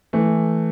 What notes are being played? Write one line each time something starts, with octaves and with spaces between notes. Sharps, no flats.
E3 A3